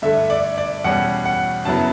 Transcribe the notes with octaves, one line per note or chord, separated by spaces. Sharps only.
G2 D3 A3 E5
D5
D5
E2 B2 G3 C#4 F#5
F#5
F#2 C#3 F#3 B3 E4 A5